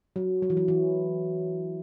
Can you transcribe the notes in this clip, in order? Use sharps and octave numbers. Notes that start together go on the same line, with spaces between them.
F#3
F#3
E3
F#3
E3